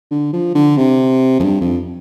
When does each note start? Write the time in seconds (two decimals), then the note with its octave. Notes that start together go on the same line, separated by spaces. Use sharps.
0.11 D3
0.33 F3
0.55 D3
0.77 C3
1.39 F2
1.44 G2
1.61 F2